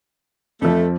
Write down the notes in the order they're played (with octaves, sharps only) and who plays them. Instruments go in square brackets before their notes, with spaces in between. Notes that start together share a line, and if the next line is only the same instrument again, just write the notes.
[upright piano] F2 F3 [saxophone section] A3